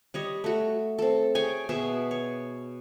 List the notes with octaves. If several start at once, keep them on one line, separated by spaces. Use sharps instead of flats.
G3 C#5 D#5
A3 F#4
C4 A4
G#4 C#5 G5 G#5
B2 G#4 C#5 E5
C#5